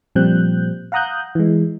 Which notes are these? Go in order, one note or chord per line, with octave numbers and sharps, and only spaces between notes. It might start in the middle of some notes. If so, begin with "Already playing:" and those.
A#2 F3 G3 C4 F#6 G6
F5 F#5 A#5 D#6 F#6 G6
E3 G#3